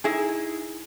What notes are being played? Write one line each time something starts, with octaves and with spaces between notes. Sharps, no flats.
D#4 E4 G#4